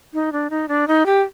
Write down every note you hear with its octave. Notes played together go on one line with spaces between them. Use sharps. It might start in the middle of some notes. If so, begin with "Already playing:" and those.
D#4
D4
D#4
D4
D#4
G4